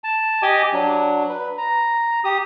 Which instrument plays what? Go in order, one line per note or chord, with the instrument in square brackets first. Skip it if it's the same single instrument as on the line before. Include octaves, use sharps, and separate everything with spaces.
[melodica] A5
G4 D#5 G#5 D6
F#3 D4
B4
A#5
G4 D#6